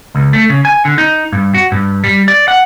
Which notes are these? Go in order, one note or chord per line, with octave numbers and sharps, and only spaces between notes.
C#2
A3
C#3
G#5
D3
D#4
G2
F#4
G2
G3
D5
F#5